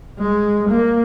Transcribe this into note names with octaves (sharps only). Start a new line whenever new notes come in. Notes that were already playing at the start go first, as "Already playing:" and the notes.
G#3
A#3